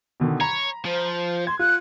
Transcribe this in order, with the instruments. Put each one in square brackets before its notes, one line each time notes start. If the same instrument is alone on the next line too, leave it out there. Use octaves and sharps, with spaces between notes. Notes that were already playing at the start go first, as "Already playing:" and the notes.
[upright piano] B2 D3 D#3
[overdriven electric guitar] C#5 [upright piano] A#5 B5
[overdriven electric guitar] F3 [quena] C5
[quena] C6 [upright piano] G#6
[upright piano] F4 [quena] F#6